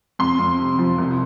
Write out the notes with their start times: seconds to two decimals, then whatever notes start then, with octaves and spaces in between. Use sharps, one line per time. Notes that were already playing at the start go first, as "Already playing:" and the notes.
0.19 F2 C6
0.39 F2
0.59 C3
0.79 F3
0.98 C2